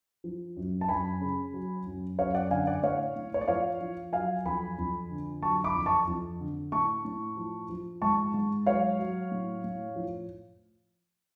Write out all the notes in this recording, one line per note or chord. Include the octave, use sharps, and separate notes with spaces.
F3
F#2
A5
F#2 G#5 B5
C#3
F#3
F#2
F#2 C#5 F5
D5 F#5
D3 F5 G#5
D5 F#5
A2 C#5 F5
A2
C#5
D5
F3 C#5 F5
F3
F#3 F5 G#5
F2 G#5 B5
F2
D3
F#3 A5 C#6
B5 D6
F2
A5 C#6
F2
D3
A2 A5 C#6
A2
F3
F3
G#2 A5 C#6
G#2
F#3 C#5 F5
F#3
A2
A2
F3